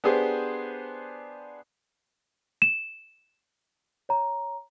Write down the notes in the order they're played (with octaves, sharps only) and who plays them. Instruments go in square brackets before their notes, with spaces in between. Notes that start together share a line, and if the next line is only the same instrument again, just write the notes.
[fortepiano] B3 D4 G4 G#4 B4 C5
[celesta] E7
C#5 A#5